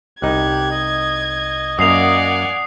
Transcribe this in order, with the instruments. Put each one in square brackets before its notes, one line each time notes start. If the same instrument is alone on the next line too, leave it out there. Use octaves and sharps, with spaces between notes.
[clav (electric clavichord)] C2 D#4 [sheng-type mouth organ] G4 F#6 [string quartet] G#6
[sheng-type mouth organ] D#5
[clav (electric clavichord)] F#2 A#3 [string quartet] D5 F#5 G#5 [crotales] D#6 C7 F7